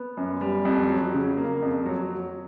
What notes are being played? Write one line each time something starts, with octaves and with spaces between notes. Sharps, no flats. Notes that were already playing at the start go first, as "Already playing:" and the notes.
Already playing: B3
F#2
G3
F2
F#3
C#3
A#3
F2
F#3